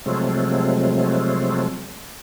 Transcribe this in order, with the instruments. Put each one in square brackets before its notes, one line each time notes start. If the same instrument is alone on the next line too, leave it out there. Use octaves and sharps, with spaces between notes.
[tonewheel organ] C3 F3 F#3 G#3 A3 C4